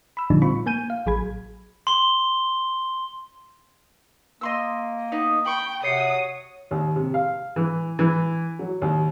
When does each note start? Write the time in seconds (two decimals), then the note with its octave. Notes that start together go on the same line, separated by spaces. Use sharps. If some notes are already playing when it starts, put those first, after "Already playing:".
0.17 B5 E6
0.30 A#2 D3 F3 G3 D4 D#4
0.42 C4 F4 B5 C#6
0.66 A#3 G#5 G6 D#7
0.90 F5
1.06 A1 F#3 G#4 B5 G#6
1.87 C6 G7
4.41 A#3 D#5 C6 E6
5.12 B3 D#4 D#5
5.46 G5 B5 C#6
5.84 C3 F#4 C#5 D#6 C7 C#7
6.71 D#2
6.96 C3
7.14 F5
7.56 E3
7.99 E3
8.59 F#3
8.82 D#2